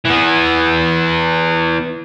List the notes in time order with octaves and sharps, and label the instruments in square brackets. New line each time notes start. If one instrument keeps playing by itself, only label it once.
[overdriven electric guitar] E3 B3